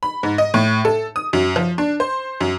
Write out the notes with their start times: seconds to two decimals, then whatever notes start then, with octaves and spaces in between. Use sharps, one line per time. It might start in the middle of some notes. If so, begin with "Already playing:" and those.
0.03 B5
0.23 G#2
0.38 D#5
0.54 A2
0.85 A4
1.16 D#6
1.33 F#2
1.56 F3
1.78 D4
2.00 C5
2.41 F#2